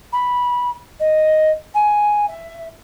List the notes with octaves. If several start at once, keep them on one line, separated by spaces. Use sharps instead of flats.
B5
D#5
G#5
E5